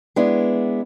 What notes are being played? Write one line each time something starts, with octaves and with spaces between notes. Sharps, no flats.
G#3 B3 D4 E4